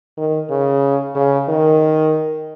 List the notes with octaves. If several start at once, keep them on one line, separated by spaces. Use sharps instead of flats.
D#3
C#3
C#3
D#3